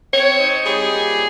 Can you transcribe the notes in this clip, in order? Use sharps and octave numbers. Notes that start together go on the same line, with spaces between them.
C4 C#5
D#4
G3 G#4
A#2